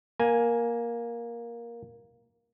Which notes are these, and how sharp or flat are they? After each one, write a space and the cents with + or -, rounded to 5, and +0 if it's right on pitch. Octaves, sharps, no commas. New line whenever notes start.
A#3 +10 G#5 +0